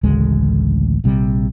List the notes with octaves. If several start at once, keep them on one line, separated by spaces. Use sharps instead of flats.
A1 D2 C#3 G#3
A#1 C3 G3